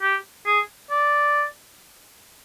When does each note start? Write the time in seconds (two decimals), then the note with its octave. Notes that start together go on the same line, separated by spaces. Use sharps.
0.02 G4
0.46 G#4
0.91 D5